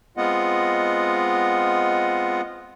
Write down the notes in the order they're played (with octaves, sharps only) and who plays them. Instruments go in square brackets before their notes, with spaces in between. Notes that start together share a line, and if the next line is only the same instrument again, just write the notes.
[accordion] G#3 B3 C4 F4 D#5 F#5